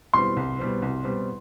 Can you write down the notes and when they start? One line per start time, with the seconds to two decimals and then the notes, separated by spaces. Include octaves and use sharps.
0.13 B2 G3 C4 C6
0.37 C2
0.59 B2 G3 C4
0.82 C2
1.04 B2 G3 C4